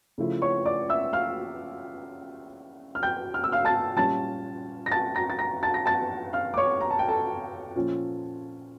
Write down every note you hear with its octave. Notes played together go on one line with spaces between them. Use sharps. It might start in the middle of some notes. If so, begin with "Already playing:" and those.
C#3 F3 A3 E4
C#5 C#6
D5 D6
E5 E6
F5 F6
F6
G5 G6
F6
E6
F5 F6
A5 A6
A#2 G3 C#4 F4 A5 A6
A#6
A5 A6
A#5 A#6
A6
A#5 A#6
A5 A6
A#6
A5 A6
F5 F6
D6
C#5 C#6
A#5
A5
G5
A4 A5
A#2 F3 C#4 F4